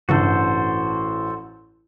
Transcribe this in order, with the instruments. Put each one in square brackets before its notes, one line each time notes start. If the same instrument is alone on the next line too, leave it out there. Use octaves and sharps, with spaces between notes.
[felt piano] A1 [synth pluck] G2 C#3 D4 [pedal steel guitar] F#4 A4 C5